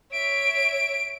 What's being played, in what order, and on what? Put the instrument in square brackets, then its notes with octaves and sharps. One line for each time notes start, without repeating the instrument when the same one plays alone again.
[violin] C#5 E5 [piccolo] D7